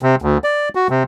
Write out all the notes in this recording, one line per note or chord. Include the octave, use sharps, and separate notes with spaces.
C3
D2
D5
F#4
C3